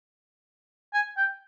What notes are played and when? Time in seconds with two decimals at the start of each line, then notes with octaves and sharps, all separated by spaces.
0.94 G#5
1.17 G5